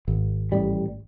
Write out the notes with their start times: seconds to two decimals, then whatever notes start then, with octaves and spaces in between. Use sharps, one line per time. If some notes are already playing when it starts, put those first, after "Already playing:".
0.08 G#1
0.52 A1 G3